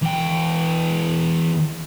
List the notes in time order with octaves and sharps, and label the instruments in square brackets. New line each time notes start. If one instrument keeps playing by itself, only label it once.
[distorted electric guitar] E2 G5